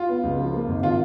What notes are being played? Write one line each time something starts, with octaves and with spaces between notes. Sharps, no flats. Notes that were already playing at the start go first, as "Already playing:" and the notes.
Already playing: F4
B3
C#2
F3
A#3
G#1
D#3 F4